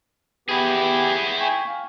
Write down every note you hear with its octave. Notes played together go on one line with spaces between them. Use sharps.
B3 E4 G4 G#4 B4
G5 G#5 C#6
F5